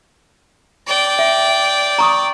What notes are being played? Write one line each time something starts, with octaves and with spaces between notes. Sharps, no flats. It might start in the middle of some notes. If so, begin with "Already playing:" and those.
D5 G5
E5
A#5 C#6 D#6